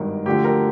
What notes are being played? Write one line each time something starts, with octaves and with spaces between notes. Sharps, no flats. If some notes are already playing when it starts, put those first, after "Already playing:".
Already playing: G#1 G2 D#3
D2 D3 F3 G4
A#4